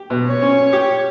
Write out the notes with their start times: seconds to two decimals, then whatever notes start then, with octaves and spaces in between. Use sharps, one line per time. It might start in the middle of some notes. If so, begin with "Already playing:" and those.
Already playing: G4
0.10 B2
0.26 C#5
0.42 C#4
0.73 G4